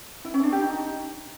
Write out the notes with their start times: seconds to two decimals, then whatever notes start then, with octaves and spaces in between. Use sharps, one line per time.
0.25 E4
0.34 C#4
0.43 D4
0.52 G4
0.62 D#4